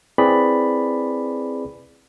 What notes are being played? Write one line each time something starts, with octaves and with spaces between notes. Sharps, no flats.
C4 E4 G#4 B4 D5 B5